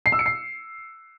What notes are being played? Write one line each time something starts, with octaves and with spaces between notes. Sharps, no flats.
C7
E6
C#7
C7